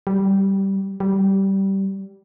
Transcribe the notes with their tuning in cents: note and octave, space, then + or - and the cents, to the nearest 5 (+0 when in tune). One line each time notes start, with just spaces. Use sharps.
G3 -10
G3 -15